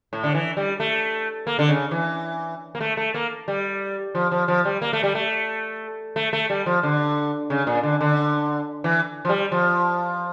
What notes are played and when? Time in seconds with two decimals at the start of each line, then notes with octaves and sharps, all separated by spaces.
0.13 A2
0.24 D3
0.35 E3
0.57 G3
0.80 A3
1.47 A#3
1.59 D3
1.69 C#3
1.91 E3
2.75 A#3
2.81 A3
2.97 A3
3.14 A#3
3.48 G3
4.15 F3
4.31 F3
4.48 F3
4.65 G3
4.82 A#3
4.93 A3
5.03 G3
5.15 A3
6.16 A3
6.33 A3
6.50 G3
6.66 F3
6.83 D3
7.50 C#3
7.67 A#2
7.83 D3
8.01 D3
8.84 E3
9.25 F3
9.29 G3
9.52 F3